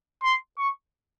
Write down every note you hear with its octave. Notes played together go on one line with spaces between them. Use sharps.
C6
C#6